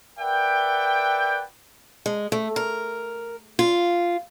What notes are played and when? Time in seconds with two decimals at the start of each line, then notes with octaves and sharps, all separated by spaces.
0.19 A#4 B4 D5 E5 F#5 G5
2.06 G#3
2.32 A3
2.56 A#4
3.59 F4